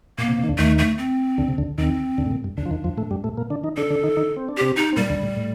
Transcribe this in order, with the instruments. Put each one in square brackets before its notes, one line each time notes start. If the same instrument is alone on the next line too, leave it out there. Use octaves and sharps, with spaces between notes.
[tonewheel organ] A#2 [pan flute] A#3
[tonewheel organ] C3
C3
D#3
D2 D3
[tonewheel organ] D#2 D#3 [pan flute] A3
[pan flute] A3
C4
[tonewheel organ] D2 D3
C3
D2 D3
[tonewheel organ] D#2 D#3 [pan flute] C4
[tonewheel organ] D2 D3
A2
A#2
G2
[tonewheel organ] D2 D3 [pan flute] D4
[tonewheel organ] F3
D#2 D#3
F2 F3
A2 A3
G2 G3
A2 A3
A#2 A#3
D3 D4
D#3 D#4
[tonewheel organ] D3 D4 [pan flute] A4
[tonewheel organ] D3 D4
D#3 D#4
D#3 D#4
C4
D4
[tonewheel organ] C3 C4 [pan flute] G4
[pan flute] D#4
[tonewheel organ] C4
[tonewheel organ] A#2 A#3 [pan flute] G3
[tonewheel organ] D2 D3
A2
A2